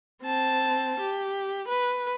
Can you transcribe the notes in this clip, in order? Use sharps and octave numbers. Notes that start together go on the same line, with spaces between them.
C4 A5
G4
B4